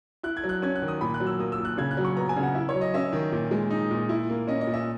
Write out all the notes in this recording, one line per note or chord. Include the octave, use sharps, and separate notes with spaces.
E4 F#6
G#6
F#3
F#6
C#4 G#6
F#6
D#3
D#6
A#2 B5
F#6
F#3
E6
A#3 D#6
E6
A#2
F#6
C#3 G#6
F#6
F#3
C#6
B3 A#5
G#5
C#3
F#5
E4 E5
C#5
F#3
D#5
C#4 E5
D#3
A#2
G#3
D#4
A#2
E4
A#3
C#4 D#5
D#5
A#2
E5